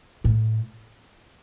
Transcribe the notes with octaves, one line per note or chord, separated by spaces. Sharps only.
A2